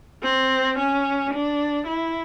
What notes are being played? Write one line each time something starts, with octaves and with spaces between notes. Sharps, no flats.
C4
C#4
D4
E4